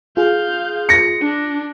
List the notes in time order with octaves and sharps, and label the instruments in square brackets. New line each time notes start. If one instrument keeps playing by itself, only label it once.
[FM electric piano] F4 G#4 [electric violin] F5 G6
[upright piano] A#6 C#7
[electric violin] D4